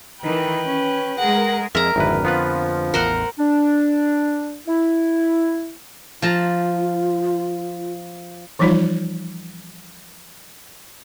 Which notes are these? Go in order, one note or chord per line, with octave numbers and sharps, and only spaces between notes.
D#3 E3 B4 G5
C#4
G#3 G#4 A#4 F#5
F2 G#3 A#4 E5 A#5
G#1 F2 D3 E4 B4
F3 B3 F4 B4
A1 E2 A#4 C5 F#5
D4
E4
F3 F4 A5 A#5
E3 F3 G3 D#4 F4